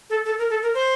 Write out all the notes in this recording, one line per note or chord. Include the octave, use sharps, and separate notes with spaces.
A4
A4
A#4
A4
A#4
C5